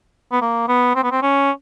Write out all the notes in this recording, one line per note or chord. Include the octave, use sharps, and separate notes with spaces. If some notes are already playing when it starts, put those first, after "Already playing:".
B3
A#3
B3
C4
B3
C4
C#4